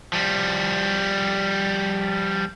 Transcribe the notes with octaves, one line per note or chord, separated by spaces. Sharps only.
F3 G3